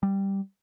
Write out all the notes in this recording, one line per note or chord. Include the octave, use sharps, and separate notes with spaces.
G3